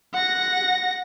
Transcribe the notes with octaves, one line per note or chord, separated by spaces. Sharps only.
F#5 A#6